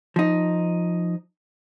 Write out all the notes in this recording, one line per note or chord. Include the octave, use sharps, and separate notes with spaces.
F3 D#4